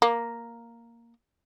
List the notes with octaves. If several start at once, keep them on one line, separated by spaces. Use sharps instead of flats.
A#3